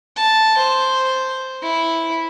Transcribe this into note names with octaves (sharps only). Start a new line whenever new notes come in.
A5
C5
E4